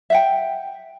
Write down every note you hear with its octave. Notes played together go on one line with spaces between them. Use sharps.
E5 F#5 G5